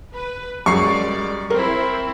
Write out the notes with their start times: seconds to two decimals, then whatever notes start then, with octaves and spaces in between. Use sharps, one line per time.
0.12 B4
0.66 F#2 G3 G#3 D5 C#6 C7
1.50 C4 E4 A#4